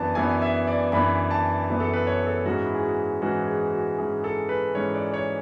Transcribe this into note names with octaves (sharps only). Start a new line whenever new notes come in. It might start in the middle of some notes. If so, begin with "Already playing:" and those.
Already playing: F#2 E3 B3 D4 A5
F#2 E3 B3 D4 G#5
E5
D5
F#2 E3 B3 D4 B5
A5
F#2 E3 B3 D4
A4
B4
C#5
A4
G#2 E3 G#3 C#4 F#4
E4
G#4
F#4
G#2 E3 G#3 C#4 F#4
G#4
F#4
G#2 E3 G#3 C#4 G#4
A4
B4
G#2 E3 G#3 C#4 C#5
D5
C#5